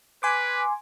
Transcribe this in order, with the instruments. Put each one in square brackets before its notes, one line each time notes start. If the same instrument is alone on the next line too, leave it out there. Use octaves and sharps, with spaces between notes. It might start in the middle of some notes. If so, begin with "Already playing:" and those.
[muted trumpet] B4 [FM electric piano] G#5 C6 D6